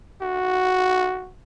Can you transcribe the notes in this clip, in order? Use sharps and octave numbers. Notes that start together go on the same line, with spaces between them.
F#4